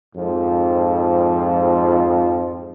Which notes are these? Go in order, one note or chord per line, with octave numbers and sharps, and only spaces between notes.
F2 G#2 F3